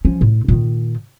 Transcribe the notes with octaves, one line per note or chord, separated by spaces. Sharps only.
F3 C#4
A2
A#2 D#3